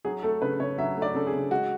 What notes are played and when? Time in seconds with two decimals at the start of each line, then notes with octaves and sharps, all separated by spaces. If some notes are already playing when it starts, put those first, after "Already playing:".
0.05 F#3 G#4
0.23 A3 A4
0.42 C#3 B4
0.60 C#3 C#5
0.78 F#3 E5
0.97 A3
1.02 D5
1.14 C#3 A4
1.27 G#4
1.33 C#3
1.51 G#3 F#4